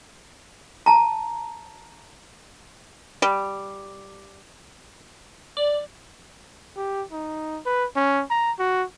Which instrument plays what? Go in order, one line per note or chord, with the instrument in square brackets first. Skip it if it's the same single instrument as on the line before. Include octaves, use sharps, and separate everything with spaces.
[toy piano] A5 A#5
[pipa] G3
[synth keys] D5
[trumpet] G4
D#4
B4
C#4
A#5
F#4